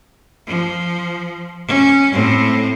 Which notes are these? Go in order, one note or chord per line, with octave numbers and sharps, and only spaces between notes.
F3
C#4
A2 C4